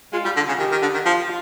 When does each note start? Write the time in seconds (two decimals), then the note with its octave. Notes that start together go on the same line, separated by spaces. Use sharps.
0.13 G#3 F4
0.25 G3
0.36 D3
0.48 C#3
0.59 D#3 G4
0.71 D#3
0.82 D3
0.94 D#3
1.05 F3 F4